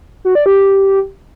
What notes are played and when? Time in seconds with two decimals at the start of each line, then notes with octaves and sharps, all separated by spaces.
0.25 F#4
0.35 D5
0.46 G4